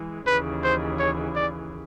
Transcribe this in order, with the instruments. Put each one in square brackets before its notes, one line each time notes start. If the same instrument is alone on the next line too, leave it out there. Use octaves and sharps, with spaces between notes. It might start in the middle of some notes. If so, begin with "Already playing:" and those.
Already playing: [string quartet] E3 G#3
[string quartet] D#2 C#3 E3 [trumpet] B4
[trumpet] C5
C#5
D5